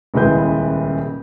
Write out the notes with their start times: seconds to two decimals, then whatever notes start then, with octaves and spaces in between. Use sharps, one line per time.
0.14 D#1 C#2 G#3 E4 B4 G6